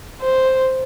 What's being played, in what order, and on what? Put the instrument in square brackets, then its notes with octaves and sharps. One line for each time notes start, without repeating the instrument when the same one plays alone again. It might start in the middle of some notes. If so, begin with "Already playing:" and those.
[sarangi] C5